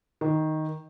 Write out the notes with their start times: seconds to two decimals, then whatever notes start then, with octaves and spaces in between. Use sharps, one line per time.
0.21 D#3